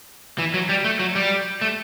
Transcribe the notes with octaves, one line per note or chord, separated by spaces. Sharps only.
E3
F#3
G3
A3
F#3
G3
A3